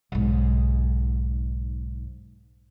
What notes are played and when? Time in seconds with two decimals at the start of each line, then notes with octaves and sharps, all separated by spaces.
0.12 B1 G#2